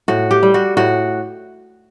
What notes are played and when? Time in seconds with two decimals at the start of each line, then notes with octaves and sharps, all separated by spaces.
0.08 A2 F#4
0.31 G4
0.43 G3
0.54 F#4
0.77 A2 F#4